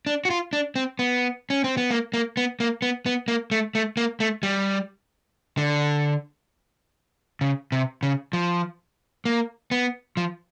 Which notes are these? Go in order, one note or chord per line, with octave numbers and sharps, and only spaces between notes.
D4
F#4
F4
D4
C4
B3
C#4
C4
B3
A#3
A#3
B3
A#3
B3
B3
A#3
A3
A3
A#3
A3
G3
D3
C#3
C3
C#3
F3
A#3
B3
F3